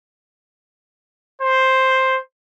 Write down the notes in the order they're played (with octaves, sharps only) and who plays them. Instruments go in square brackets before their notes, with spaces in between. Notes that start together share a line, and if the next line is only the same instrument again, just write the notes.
[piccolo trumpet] C5